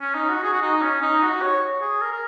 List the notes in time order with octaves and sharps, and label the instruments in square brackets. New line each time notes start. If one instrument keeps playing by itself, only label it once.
[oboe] C#4
D#4
F#4
G#4
F#4
D#4
C#4
D#4
F#4
C#5
G#4
A#4
A#4